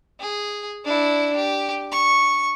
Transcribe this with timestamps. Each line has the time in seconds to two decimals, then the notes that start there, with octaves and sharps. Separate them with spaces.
0.20 G#4
0.85 D4 E4
1.36 G4
1.92 C#6